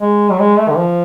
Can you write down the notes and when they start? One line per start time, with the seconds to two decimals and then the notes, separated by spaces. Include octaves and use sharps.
0.01 G#3
0.31 F#3
0.39 G#3
0.58 A3
0.69 D3
0.77 F3